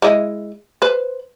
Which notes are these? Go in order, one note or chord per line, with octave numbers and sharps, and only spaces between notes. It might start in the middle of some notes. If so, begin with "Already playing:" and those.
G#3 E4 D#5
B4 C5